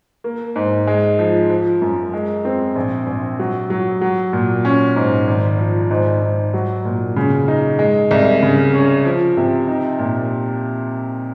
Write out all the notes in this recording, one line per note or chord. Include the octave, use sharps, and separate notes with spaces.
A#3
G#2
G#3
F3
F3
F#2
G#3
C4
A#1
A#1
F#3
F#3
F#3
A#2
C#4
G#2
G#1
F3
G#2
G#2
F#3
A#2
C#3
D#4
G#3
C2
C#3
C#4
F3
C3
D#4
A#2